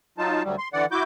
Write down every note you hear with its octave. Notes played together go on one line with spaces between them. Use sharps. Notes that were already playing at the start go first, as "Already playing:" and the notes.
F#3 D#4 F4 A5
D2 F#3 G3
C6
D3 E3 D5 F#5
E4 F#4 D6 G6